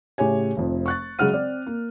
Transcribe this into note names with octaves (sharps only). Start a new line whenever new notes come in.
A2 C#3 G4 C#5 G#5
F1 F2
C#6 F#6 A6
C#3 F#3 G#3 F#5 F6 D#7
C4 D5
A#3